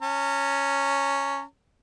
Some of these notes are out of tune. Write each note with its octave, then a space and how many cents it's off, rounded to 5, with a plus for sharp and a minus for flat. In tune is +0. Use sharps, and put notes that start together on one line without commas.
C#4 +0 A#5 -45